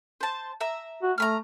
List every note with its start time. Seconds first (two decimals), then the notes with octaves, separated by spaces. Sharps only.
0.21 C5 A5
0.60 E5 A#5
1.02 F#4
1.18 A3 A#5 B5 F6